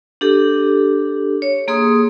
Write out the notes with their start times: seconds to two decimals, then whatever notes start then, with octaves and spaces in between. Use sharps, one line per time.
0.21 D4 G4 A4
1.42 C#5
1.68 A#3 G#4 C6 D#6